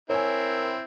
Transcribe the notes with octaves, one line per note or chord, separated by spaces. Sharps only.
C4 E4 A#4 C#5 G#5